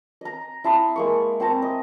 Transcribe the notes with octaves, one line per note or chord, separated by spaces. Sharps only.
D#5 A#5
E4 A5 C6 D#6
G#3 A#3 C#6
C4 C5 A5 A#5
D#5